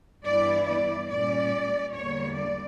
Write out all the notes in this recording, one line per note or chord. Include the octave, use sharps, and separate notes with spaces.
G2 E3 B3 E4 D5
D5
A#2 G3 C#4 D5
E2 D3 G3 A#3 C#5
D5